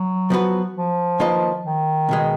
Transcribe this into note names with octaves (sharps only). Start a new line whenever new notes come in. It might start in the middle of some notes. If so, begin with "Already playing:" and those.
Already playing: F#3
F3 B3 F#4 B4
F3
D#3 A#3 F4 B4 D#5
D#3
C#2 B2 G#3